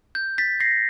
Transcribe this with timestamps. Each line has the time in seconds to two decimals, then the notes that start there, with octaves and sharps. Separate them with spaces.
0.15 G6
0.38 A6 B6
0.60 A#6 C7